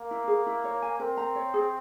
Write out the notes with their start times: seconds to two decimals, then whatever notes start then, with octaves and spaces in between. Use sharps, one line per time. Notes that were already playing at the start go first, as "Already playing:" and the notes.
Already playing: A#3
0.11 E4
0.28 G#4
0.46 E4
0.64 C#5
0.82 G#5
1.00 C4 A#4
1.17 A#5
1.35 C#5
1.54 G#4